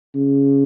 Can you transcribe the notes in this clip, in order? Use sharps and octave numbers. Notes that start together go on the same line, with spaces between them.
C#3